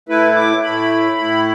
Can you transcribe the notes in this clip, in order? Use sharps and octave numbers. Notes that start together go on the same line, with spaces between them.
A2 A3 E4 B4
D6
A2 A3 E4 B5
A2 A3 E4